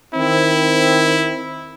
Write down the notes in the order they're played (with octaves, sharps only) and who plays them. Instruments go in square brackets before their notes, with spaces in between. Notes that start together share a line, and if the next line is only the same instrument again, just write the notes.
[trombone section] D#3 C4 [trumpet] E4